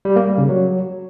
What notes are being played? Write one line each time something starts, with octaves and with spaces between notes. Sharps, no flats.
G3
A#3
G3
C#3
F#3